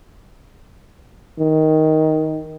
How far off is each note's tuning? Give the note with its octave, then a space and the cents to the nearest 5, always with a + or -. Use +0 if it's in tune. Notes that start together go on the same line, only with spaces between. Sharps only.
D#3 +10